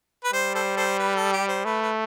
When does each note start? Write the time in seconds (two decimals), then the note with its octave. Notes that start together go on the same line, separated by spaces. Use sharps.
0.24 B4
0.33 G3 C5
0.55 A4 C5
0.77 A4 C5
0.99 B4
1.16 A4
1.32 G4
1.48 C5
1.65 A3 B4
1.82 B4